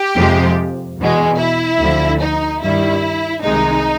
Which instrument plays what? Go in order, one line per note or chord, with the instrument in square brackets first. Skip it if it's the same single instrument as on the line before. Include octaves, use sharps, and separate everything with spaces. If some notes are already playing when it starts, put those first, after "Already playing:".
Already playing: [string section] G4
F2 C3 F3 G#3
E2 B2 G#3
E4
D2 D3 F3
D#4
G2 D#3 G3 E4
C2 C3 D#3 G#3 D#4